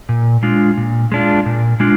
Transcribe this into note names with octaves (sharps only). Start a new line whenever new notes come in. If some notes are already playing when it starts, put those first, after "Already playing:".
A#2
G#3 D4 F4
A#2
G#3 D4 F4
A#2
G#3 D4 F4